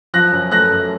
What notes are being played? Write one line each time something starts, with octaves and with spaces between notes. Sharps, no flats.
F3 F#6 A#6
F#2
A3 F#6 A#6
F#2